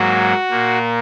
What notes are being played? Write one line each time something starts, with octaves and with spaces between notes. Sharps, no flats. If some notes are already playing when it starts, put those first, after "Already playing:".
Already playing: G#2 F#3 A#3 F#4
A#2 A#3